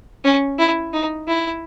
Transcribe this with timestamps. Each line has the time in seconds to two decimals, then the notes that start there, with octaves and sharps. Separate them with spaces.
0.24 C#4
0.59 E4
0.94 D#4
1.28 E4